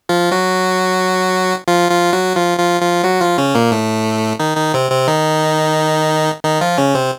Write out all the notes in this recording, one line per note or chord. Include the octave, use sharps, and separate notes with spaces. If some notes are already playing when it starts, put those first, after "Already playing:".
F3 F4
F#3 F#4
F3 F4
F3 F4
F#3 F#4
F3 F4
F3 F4
F3 F4
F#3 F#4
F3 F4
C#3 C#4
A#2 A#3
A2 A3
D#3 D#4
D#3 D#4
C3 C4
C3 C4
D#3 D#4
D#3 D#4
F3 F4
C#3 C#4
C3 C4